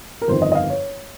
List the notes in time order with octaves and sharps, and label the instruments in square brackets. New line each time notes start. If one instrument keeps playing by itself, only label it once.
[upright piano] A#4
G1 F2 D#3 C5
D#5
D#5
F5
C#5